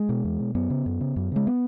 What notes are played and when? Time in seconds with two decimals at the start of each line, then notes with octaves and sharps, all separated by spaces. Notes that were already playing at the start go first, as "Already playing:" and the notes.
Already playing: G#3
0.09 B2
0.24 E2
0.40 B2
0.55 F#2 B3
0.70 C#3
0.86 F#2
1.01 C#3
1.16 F#2
1.32 C#3 G#3
1.47 B3